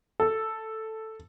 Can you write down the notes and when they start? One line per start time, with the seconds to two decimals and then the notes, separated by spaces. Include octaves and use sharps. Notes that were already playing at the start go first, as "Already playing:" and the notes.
0.20 A4